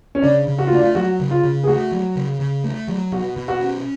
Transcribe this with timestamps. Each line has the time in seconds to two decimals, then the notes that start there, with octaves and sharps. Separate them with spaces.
0.15 C#4
0.22 C#3 D4
0.47 C#3
0.59 F#4
0.67 F4
0.71 A3 D4
0.81 F4
0.95 F#3 F#4
1.20 C#3
1.31 F4
1.44 C#3
1.64 G#4
1.67 A3 F#4
1.91 F#3
2.16 C#3
2.39 C#3
2.64 A3
2.88 F#3
3.12 B2 F#4
3.36 B2
3.48 F#4
3.60 C#4